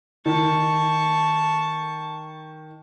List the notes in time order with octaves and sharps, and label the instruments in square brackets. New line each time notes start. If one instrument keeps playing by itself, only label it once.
[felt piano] D#3 [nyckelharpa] A5 C#6